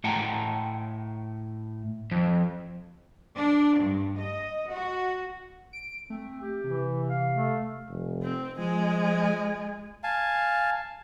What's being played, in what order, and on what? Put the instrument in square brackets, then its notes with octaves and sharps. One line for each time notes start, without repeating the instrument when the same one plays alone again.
[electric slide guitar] A2 F#5 G5 A5 A#5
[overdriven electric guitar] F2
[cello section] D4
G2
D#5
F#4
[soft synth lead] D7
[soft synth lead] A3 [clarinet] C4
[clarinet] G4
[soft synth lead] C3 [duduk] E3
[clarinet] F5
[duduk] A3
[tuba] F1
[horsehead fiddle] C4
[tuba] F3 [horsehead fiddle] G#3 G#5
[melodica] F5 G#5 A5